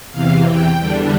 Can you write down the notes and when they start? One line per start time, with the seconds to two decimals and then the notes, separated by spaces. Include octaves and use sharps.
0.11 E2 C3 E3 F5
0.45 G5
0.79 E2 D3 G3 D4